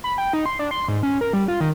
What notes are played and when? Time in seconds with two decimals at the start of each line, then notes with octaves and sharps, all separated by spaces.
0.04 B5
0.18 G5
0.33 D#4
0.46 C6
0.59 D4
0.71 C6
0.88 G#2
1.03 C#4
1.21 A#4
1.33 G3
1.48 F4
1.61 D#3